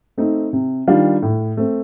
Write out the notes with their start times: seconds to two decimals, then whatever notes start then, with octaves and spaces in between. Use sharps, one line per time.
0.18 A3 C4 D#4
0.53 C3
0.88 D#3 G3 D4 F4
1.22 A2
1.57 A3 C4